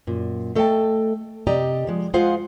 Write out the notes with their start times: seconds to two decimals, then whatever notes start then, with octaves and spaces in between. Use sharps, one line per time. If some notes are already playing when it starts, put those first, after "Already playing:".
0.07 F#2 A#2
0.55 A3 A4 D#5 F5 G5 A5
1.47 C3 G4 D5 D#5 A#5
1.87 F3 G#3
2.14 G#3 F4 G#4 C5 F5 F#5